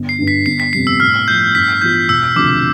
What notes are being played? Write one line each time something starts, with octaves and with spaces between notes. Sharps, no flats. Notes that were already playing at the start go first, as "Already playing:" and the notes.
Already playing: G1
C7
G2 D3
B6
G1 C7
B6
F2 C3 G3 B3 C7
E6
A2 F6
F3 A3 G6
G2 B6
E3 B3 F4 G6
E1 E6
D2 C3 F3 D6